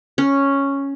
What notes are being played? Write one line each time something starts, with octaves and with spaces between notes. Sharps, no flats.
C#4